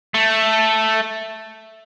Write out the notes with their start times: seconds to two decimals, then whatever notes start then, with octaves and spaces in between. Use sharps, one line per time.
0.14 A3